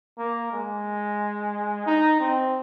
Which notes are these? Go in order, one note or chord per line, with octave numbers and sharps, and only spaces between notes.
A#3
G#3
D#4
C4